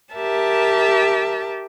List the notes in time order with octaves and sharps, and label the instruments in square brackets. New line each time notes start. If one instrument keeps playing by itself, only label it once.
[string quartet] G4 A#4 E5 A5